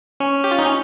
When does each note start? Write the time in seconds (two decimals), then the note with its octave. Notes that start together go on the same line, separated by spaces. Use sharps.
0.20 C#4
0.44 G4
0.51 F4
0.59 D#4
0.66 C#4